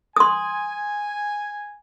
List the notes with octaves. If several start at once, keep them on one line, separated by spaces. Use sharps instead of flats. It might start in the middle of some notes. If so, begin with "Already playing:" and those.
G#5 C6 D#6